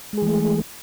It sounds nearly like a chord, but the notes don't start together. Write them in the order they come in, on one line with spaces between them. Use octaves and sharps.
G#3 G#4 E3 A3